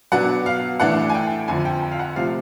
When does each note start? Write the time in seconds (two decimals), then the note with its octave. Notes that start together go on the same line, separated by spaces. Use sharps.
0.12 B2 F#3 B3 D4 F#5
0.46 F5
0.80 A2 E3 A3 D4 F#5
1.09 G#5
1.14 G5
1.48 F2 D3 F3 G#5
1.65 G5
1.82 G5
1.92 F5
1.99 F#5
2.16 C3 F3 A3 F5